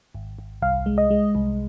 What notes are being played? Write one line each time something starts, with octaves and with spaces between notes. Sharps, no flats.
G#1
G#1
C2 F5
G#3
D#5
G#3
C2